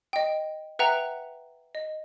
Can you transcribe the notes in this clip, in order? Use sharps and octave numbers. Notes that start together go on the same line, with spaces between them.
D#5 G5
B4 E5 F#5 G5 A#5
D#5